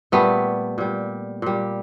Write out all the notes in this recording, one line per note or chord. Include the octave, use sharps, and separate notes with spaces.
A#2 G3 A3 B3
A#2 G3
A#2 G3